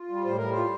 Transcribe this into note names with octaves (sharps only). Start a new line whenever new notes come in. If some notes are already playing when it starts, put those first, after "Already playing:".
Already playing: F4
G3
A2 C5
G3 A#4
C5
F4